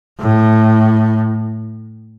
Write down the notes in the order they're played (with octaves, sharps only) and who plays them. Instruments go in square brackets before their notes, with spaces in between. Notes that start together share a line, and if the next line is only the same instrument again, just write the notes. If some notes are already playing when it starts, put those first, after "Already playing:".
[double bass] A2